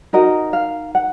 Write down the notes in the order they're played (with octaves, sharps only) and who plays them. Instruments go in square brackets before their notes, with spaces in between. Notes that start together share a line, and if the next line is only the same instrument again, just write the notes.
[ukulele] D#4 F#4 A#4 D#5
F5
F#5